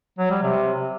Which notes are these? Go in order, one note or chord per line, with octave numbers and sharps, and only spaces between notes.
F#3
G3
C3